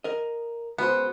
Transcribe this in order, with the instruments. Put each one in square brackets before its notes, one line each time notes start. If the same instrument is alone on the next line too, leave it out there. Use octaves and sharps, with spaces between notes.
[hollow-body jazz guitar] A#4 D#5
[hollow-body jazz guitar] C#2 F#4 C5 [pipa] B3